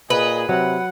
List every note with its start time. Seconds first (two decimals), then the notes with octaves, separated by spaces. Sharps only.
0.10 A#2 G#4 B4 D#5
0.49 C3 F#3 F#5